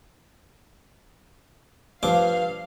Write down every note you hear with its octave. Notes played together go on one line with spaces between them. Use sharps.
G2 F3 F5 D6